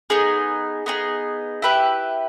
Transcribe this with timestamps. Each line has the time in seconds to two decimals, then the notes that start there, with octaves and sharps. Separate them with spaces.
0.10 B3 D#4 G#4
0.86 B3 D#4 G#4
1.62 E4 G4 B4 E5